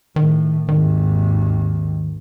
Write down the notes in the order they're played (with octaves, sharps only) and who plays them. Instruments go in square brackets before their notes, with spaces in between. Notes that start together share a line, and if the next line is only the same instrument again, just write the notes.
[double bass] A2 [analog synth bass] D#3
[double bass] G#1 D#2 [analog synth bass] D#3